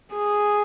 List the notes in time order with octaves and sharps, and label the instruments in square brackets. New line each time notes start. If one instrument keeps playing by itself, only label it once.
[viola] G#4